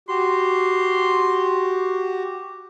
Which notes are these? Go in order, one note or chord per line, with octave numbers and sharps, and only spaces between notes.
F#4 G4 C6